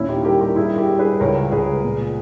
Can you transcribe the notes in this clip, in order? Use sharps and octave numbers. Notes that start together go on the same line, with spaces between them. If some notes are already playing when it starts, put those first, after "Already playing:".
Already playing: D#2 A#2 C#4 E4
D#4 G4
G3 G4 A#4
G4 A#4
G2 E4 G#4
G4 A#4
G3
G#4 B4
C#2 A#4 C#5
C#2 G#4 B4
A#2